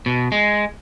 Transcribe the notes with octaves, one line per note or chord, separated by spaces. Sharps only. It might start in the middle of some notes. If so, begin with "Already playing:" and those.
B2
G#3